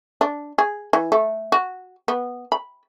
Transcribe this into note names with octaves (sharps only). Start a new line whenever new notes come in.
D4
G#4
E3
A3
F#4
B3
B5